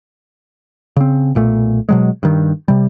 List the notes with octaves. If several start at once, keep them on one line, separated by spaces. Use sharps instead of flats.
C#3 C4
B1 A#2 A3
B2 F#3 G#3
G2 D#3
C3 G3